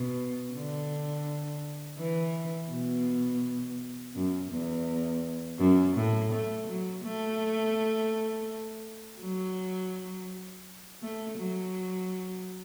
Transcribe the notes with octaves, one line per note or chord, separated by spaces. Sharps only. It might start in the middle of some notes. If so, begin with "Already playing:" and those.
Already playing: B2
D3
E3
B2
F#2
E2
F#2
A2
A3
F#3
A3
F#3
A3
F#3